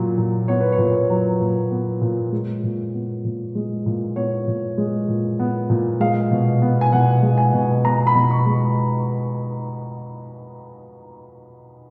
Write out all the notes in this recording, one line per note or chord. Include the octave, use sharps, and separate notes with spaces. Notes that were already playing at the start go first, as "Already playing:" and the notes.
Already playing: A#2 F#3
A#2
B3 C#5
B4
C#5
A#2
F#3
A#2
B3
A#2
G#3
A#2
B3
A#2
G#3
A#2
B3 C#5
A#2
G#3
A#2
B3
A#2
G#3 F5
B2
B3
G#5
B2 F#5
G#3
G#5
B2
B3 A#5
B5
B2
C#6
G#3